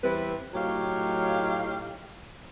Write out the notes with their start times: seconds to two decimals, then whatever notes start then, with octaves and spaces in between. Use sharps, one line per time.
0.03 E2 G3 C4 E4 B4
0.54 A2 F#3 D#4 G4 C#5 F5